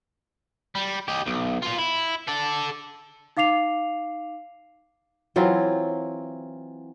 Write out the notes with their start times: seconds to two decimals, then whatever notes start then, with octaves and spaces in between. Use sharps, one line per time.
0.75 G3
1.08 G4 D#5
1.26 B1
1.62 A#3 F4
1.78 E4
2.28 A4 D5
3.37 D#4 F5 D6 C7 F7
5.36 E3 F#3 C4 F4